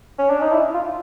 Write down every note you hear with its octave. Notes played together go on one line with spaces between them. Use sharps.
C#4
D4
D#4
E4
F4